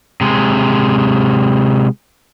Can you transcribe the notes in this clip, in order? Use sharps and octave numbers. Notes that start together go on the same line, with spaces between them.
C3 G#3